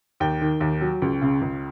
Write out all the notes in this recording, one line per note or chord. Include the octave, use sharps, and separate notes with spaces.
D#2 G5
D#3
D#2
F#3
C#2
C#3
C#2